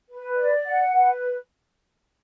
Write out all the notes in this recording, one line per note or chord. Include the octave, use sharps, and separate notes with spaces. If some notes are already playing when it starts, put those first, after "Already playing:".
B4
D5
F#5
B4